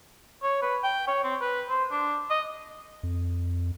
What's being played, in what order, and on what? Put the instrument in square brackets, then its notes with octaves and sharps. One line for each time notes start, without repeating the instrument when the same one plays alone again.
[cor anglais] C#5
B4
G5
C#5
C4
B4
C5
D4
D#5
[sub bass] F2